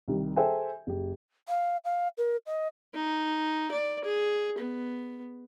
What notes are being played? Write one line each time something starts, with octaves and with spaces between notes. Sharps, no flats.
C2 D#3 G3
G#4 A4 C5 E5 G5 G#5
F#1 G4
F5
F5
A#4
D#5
D#4
D5
G#4
B3